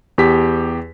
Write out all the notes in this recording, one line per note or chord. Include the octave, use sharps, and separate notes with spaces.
E2 G4 B6